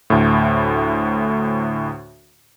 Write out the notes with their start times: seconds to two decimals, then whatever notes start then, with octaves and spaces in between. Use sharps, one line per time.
0.10 D2 A2